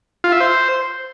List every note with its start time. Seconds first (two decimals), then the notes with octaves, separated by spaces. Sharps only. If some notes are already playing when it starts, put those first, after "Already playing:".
0.24 F4
0.32 E5
0.40 C5